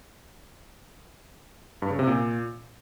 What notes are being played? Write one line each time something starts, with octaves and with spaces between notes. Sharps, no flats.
G2
C#3
C3
A#2